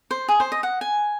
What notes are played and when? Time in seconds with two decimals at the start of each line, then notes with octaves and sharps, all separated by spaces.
0.11 C5
0.28 G#4
0.40 C5
0.52 D#5
0.63 F#5
0.81 G#5